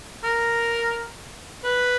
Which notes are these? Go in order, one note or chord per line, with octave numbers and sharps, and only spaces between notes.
A#4
B4